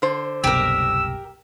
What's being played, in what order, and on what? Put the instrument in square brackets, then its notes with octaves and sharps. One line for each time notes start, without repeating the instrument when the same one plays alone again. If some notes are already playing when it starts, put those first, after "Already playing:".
[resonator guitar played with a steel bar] D3 C5
[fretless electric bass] F#1 C2 B2 [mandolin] G4 A#4 [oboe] E6